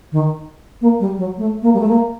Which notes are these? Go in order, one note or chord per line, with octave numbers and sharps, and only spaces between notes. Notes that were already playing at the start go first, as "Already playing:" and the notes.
D#3
A#3
G3
F#3
A3
A#3
G3
A3
A#3